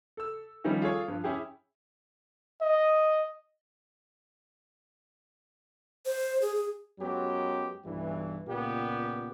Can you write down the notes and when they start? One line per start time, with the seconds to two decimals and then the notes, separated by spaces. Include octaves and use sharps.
0.17 A4 E6
0.64 D#3 F3 G3 C#4 D#4 E4
0.82 F4 G#4 A4 C#5
1.08 G2 F3
1.24 C#4 E4 G4 G#4
2.62 D#5
6.05 C5
6.41 G#4
6.55 G#4
7.00 F#2 F#3 G#3 B3 G4
7.85 B1 G2 E3
8.47 C#2 A#2 B3 G4